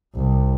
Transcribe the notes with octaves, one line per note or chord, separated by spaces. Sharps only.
C2